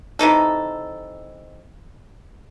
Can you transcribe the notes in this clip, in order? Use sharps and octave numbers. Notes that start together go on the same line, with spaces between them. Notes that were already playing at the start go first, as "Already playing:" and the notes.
C3 E3 D#4 A4